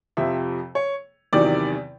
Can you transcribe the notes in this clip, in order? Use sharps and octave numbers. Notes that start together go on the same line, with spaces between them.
F2 C3 F3 E5
C#5
E2 C3 D#3 F#3 D5